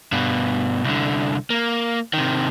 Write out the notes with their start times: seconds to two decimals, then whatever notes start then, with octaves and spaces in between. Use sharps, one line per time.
0.12 G2 B2
0.84 C2 D3
1.50 A#3
2.14 C3 D#3